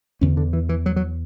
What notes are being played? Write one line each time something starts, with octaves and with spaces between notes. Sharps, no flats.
E2 D3 C#4
D3
E3
E3
F#3
F#3